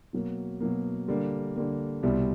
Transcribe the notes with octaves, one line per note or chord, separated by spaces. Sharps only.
B2 F#3 A#3
B2 F#3 A#3
D3 G3 A#3
D3 G3 A#3
C2 B2 G3 C4